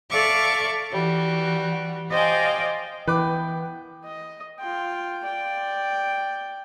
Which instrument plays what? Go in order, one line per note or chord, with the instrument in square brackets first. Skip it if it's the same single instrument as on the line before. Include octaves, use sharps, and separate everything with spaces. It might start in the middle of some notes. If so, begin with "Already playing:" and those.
[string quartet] A4 D5 E5 F5 C#6 D6
E3 G3 F#4
C5 D5 D#5 F5 G5 G#5
[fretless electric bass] E3 [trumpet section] B3 G5 [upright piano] B4 D6
[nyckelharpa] D#5
F4 G5
D5 G5